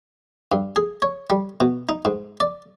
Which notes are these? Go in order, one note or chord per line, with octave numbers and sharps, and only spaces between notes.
G2
G#4
C#5
G3
B2
D#4
G#2
D5